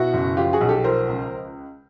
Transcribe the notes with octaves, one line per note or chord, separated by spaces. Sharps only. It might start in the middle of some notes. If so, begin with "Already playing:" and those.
Already playing: B2 E4 F#4
F#1
F3 F4 G4
F#4 G#4
B1
G4 A4
F3 A#4 C5
C#2